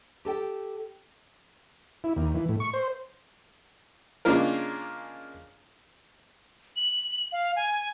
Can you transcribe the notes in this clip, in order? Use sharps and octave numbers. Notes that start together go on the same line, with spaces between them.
G4 A4 G5
E4
D#2
E3
A2
C#6
C5
C#3 G#3 A#3 D4 F4 A#4
F#7
F5
G#5